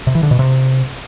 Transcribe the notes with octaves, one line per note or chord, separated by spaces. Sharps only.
C3
E3
D3
B2
C3